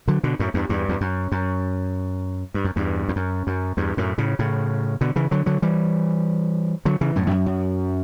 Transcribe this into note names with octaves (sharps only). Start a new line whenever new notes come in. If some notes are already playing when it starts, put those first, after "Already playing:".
D3 F#3
B2 D3
F#2 A2
E2 G2
E2 G2
E2
F#2
F#2
G2
F#2
E2 G2
E2
F#2
F#2
E2 G2
F#2 A2
A2 C#3
A2 C#3
B2 D3
C#3 E3
D3 F#3
D3 F#3
E3 G3
D3 F#3
C#3 E3
F#2 A2
E2
F#2
F#2